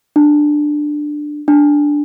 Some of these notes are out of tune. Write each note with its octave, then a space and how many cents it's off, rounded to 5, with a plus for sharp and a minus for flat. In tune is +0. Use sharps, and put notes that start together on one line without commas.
D4 +10
D4 -5